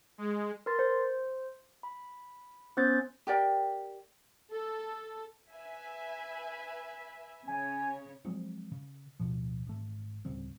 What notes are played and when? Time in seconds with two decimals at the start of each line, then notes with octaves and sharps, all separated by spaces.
0.18 G#3
0.66 A#4 B4 C6 A6
0.79 C5
1.83 B5
2.77 B3 C#4 C5 G6 A6
3.27 G4 A#4 D5 G5
4.52 A4
5.50 B4 E5 G#5
7.47 C#3 C#5 G#5
8.25 F3 F#3 G#3 C4
8.72 C#3
9.20 D1 B2 F3
9.67 G#1 A3
10.25 D1 C#3 G3 C4